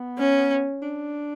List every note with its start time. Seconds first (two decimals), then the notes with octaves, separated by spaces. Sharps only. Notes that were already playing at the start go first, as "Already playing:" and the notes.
Already playing: B3
0.19 C#4
0.82 D4